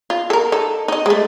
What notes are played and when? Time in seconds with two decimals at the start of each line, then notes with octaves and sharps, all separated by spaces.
0.10 F4
0.30 A4 A#4
0.52 D#4 A4
0.88 D#4 D#5
1.06 G#3 A3